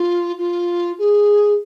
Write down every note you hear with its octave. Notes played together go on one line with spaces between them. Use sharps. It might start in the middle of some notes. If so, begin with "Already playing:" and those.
Already playing: F4
F4
G#4